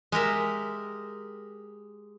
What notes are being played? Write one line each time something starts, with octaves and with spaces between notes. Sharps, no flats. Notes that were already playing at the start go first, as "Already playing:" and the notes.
G#3 G4 A#4 E5